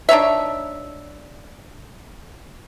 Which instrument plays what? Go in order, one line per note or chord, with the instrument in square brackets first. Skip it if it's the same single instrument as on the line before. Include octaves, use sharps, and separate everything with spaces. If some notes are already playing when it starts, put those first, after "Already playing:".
[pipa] D4 D#4 C#5 E5